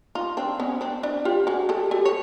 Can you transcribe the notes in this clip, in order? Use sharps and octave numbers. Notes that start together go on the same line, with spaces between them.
D#4 F4
C4 D4
B3 C#4
C4 D4
D4 E4
F4 G4
F#4 G#4
G4 A4
G4 A4
C#5